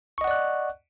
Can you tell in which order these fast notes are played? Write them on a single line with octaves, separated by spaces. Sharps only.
C#6 D#5 F#5 D5 F#6